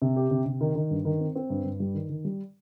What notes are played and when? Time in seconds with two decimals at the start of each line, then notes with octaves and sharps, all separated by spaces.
0.02 C3
0.16 G4
0.31 C3
0.46 C3
0.61 D#3
0.75 D#3
0.91 G2
1.05 D#3
1.20 C4
1.36 C4
1.50 G2
1.64 G2
1.80 G3
1.94 D#3
2.09 D#3
2.25 G3